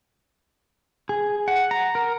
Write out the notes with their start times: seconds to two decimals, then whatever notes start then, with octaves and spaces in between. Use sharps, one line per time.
1.09 G#4
1.48 F#5
1.71 A#5
1.95 A#4